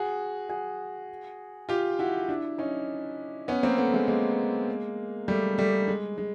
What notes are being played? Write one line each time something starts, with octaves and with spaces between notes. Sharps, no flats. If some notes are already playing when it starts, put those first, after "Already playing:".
Already playing: F#4 G#4
F#4 G#4
F4 G4
E4 F#4
D4 E4
C#4 D#4
B3 C#4
A#3 C4
A3 B3
A3
G#3 A#3
G#3 A#3
G3 A3
G3 A3
G#3
G#3